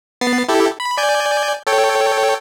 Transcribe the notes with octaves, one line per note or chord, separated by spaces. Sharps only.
B3 A6 C7
E4 G4 A4
B5
D5 G#5 G6
A4 C#5 G5